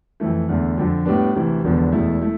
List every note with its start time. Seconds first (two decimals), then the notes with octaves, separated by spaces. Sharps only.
0.20 F2 E3 A3
0.49 E2 D3 A3
0.77 F2 D3 F3
1.05 A2 G3 B3 D4
1.35 D2 C3 E3
1.64 E1 E2 D3 F3 B3
1.92 E1 E2 B2 A3 E4
2.21 A3 E4